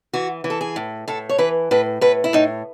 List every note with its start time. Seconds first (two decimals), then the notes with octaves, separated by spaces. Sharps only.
0.13 E3 F#4
0.44 E3
0.50 A4
0.61 G#4
0.76 A2
1.08 A2 A4
1.29 C#5
1.38 E3 B4
1.71 A2 B4
2.01 A2 B4
2.24 E4
2.33 A2 D#4